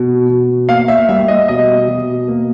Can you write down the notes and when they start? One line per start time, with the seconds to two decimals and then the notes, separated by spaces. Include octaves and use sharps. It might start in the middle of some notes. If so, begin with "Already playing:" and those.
Already playing: B2
0.29 B2
0.68 A#3 F5
0.88 E5
1.09 G3 E5
1.28 D#5
1.48 B2 D#5
1.88 B2
2.28 A#3